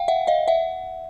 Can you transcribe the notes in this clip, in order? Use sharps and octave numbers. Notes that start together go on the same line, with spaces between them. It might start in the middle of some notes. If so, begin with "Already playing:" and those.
Already playing: F5 G5
E5 F#5
D#5 F5
E5 F#5